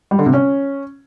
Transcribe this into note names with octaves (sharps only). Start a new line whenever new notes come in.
G3
D3
C3
C#4